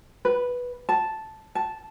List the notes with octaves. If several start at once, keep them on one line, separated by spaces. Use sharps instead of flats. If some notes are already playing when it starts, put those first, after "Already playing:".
B4
A5
A5